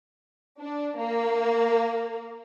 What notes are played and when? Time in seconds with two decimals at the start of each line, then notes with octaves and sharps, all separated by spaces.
0.61 D4
0.98 A#3